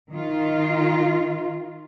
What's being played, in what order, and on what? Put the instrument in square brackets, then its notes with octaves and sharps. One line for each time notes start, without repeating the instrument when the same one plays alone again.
[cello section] D#3 F4